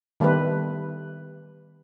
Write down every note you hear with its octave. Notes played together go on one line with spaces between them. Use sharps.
D#3 G3 A3 B3 B4